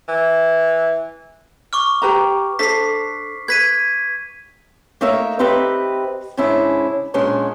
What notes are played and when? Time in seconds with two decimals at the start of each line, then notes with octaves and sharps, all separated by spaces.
0.08 E3
1.73 C#6 D6 F6
2.02 G4 B4 A#5
2.59 D4 A4 C5 B6 C7
3.48 B4 G#6 B6 D#7
5.01 A3 A#3 D#4 A#4 C#5 E5
5.39 C4 D#4 G4 B4 E5
6.37 G#2 C#3 C#4 D4 E4
7.14 A#2 G#3 C#4 D4